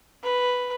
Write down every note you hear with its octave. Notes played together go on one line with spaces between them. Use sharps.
B4